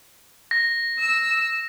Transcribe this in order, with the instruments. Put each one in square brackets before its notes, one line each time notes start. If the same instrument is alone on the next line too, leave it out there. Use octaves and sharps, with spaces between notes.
[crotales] A#6
[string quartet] E6